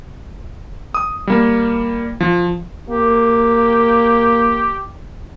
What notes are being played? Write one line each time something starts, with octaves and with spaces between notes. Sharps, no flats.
D#6
G3 A#3
F3
A#3 G4